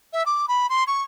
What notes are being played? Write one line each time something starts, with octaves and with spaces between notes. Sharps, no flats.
E5
D6
B5
C6
C#6